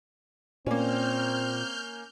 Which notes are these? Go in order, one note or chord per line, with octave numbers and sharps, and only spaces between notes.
A#2 A#3 C4 C#4 F6 G6